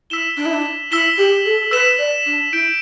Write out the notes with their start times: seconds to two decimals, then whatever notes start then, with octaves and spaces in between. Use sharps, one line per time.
0.10 E4 E6 B6 E7 G7
0.37 D4
0.45 E4
0.53 D4
0.91 E4 E6 B6 E7 G7
1.18 G4
1.45 A4
1.71 B4 E6 B6 E7 G7
1.98 D5
2.26 D4
2.53 E4 G6 D7 G7